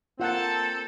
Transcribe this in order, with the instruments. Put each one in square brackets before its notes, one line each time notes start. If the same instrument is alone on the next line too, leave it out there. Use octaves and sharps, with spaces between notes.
[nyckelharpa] A#3 A5 [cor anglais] C4 [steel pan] F4 F#5 [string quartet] A4